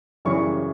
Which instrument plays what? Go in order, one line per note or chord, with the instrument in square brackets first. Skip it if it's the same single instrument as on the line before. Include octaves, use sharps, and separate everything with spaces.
[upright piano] F#2 C#3 E3 G3 C#4 C#6